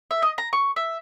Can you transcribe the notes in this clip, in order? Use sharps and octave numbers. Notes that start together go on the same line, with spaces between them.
E5
D#5
A#5
C#6
E5